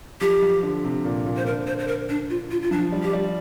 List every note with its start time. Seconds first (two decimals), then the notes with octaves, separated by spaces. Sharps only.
0.21 F3 G4
0.42 F3
0.63 D3
0.84 C3
1.05 A#2
1.26 A#2
1.37 C5
1.46 D3 A#4
1.67 C5
1.79 C5
1.88 A#4
2.09 D4
2.30 F4
2.51 F4
2.62 F4
2.71 F3 D4
2.92 G3
3.03 G4
3.13 G3